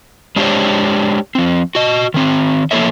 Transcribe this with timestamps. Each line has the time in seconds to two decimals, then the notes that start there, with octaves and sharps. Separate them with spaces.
0.36 G#3 D4 F#4 G4 C5 C#5
1.35 F3 C4
1.75 F#4 D#5
2.14 D#3 C4
2.71 F3 A#3 B3 A4 C#5 E5